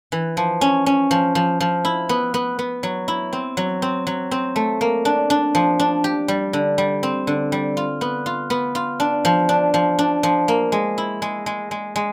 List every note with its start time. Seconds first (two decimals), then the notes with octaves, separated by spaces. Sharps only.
0.12 E3
0.37 F3
0.61 C#4
0.86 C#4
1.11 F3
1.35 F3
1.60 F3
1.85 E4
2.09 B3
2.34 B3
2.59 B3
2.83 F#3
3.08 E4
3.33 C4
3.57 F#3
3.82 C4
4.07 F#3
4.31 C4
4.56 A3
4.81 A#3
5.05 D4
5.30 D4
5.55 F3
5.80 D4
6.04 G4
6.28 G3
6.53 D3
6.78 G3
7.03 C4
7.27 D3
7.52 G3
7.77 F4
8.01 B3
8.26 F4
8.50 B3
8.75 F4
9.00 D4
9.25 F3
9.49 D4
9.74 F3
9.99 D4
10.23 F3
10.48 A#3
10.72 G#3
10.98 E4
11.22 G#3
11.46 G#3
11.71 G#3
11.96 G#3